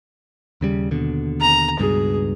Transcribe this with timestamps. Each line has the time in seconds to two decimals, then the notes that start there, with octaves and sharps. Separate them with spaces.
0.61 D#2 C#3 G3
0.91 D#2 B2 D3
1.41 A#5
1.79 C#2 G2 B2 G#4